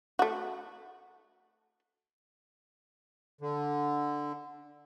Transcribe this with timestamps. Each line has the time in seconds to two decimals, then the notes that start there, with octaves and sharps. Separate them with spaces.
0.19 A3 F#4
3.41 D3